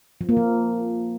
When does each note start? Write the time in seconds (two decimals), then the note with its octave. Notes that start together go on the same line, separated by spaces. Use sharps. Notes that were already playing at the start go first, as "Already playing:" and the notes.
0.21 F3
0.29 A#3
0.37 F3